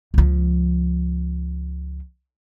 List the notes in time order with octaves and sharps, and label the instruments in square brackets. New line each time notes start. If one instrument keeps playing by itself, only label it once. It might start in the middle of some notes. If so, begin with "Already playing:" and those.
[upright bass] C#2 F3